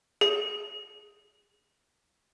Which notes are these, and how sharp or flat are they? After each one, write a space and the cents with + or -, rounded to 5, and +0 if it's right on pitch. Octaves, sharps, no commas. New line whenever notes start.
G#4 +5